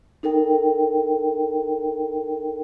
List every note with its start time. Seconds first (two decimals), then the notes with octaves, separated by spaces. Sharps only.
0.23 D#4 A4 A#4 G5